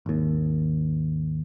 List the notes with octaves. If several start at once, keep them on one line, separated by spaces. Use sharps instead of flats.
G#1 D#2